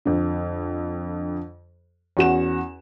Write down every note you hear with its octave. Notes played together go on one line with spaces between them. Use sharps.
F2 D3
E2 C#4 F#4 F#5 E7